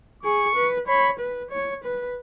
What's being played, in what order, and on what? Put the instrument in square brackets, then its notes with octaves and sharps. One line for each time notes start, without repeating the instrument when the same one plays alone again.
[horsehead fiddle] G#4 [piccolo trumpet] C#6
[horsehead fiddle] B4
[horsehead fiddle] C#5 [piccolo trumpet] B5
[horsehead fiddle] B4
C#5
B4